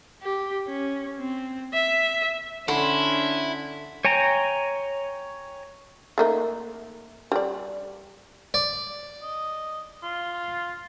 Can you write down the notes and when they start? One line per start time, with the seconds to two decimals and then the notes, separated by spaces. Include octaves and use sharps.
0.22 G4
0.68 C#4
1.19 C4
1.73 E5
2.68 D3 C#4 D4 E4 C6
4.05 C#5 G5 G#5 A#5
6.18 A3 A#3 D#4
7.32 G3 D5
8.54 D5
9.23 D#5
10.03 F4